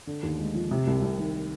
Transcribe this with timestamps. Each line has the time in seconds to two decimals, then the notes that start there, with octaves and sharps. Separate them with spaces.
0.07 D3
0.23 D#2
0.39 G#3
0.55 F3
0.71 C3
0.87 C2
1.02 C2
1.18 D#3